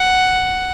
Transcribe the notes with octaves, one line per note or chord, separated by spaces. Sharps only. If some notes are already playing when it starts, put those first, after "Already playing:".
Already playing: F#5